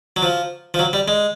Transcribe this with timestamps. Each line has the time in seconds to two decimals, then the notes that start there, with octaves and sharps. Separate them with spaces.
0.16 F#3
0.23 F3
0.74 F3
0.79 F#3
0.93 G3
1.08 G#3